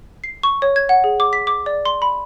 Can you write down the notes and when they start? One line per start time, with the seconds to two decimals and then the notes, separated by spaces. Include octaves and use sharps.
0.24 C7
0.43 C#6
0.62 C#5
0.76 G#6
0.89 F#5
1.04 G#4
1.20 D6
1.33 B6
1.47 D6
1.66 D5
1.86 C6
2.02 B5